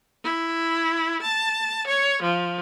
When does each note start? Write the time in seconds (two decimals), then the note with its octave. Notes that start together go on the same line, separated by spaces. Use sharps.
0.24 E4
1.21 A5
1.87 C#5
2.22 F3